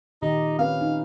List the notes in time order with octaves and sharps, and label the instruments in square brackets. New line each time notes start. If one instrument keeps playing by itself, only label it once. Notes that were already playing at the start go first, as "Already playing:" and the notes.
[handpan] A#2 D#3 G4 [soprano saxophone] D#4
[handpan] C4 C#4 B4 [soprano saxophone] F5
[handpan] D#4